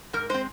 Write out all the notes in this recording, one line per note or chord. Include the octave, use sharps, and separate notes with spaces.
G#2 A#4
G#3 C4 C5